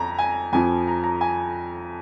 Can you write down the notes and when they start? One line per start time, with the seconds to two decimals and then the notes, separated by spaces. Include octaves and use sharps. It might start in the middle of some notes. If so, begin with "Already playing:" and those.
Already playing: F2 A#5
0.18 G#5
0.52 F2 F3 G#5
0.87 A#5
1.04 A#5
1.21 G#5